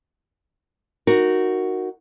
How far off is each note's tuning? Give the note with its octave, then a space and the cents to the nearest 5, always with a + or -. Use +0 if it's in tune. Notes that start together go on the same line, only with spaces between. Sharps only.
D#4 +0 F#4 +0 A#4 +0